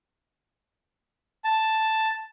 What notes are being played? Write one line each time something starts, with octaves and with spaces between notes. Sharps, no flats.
A5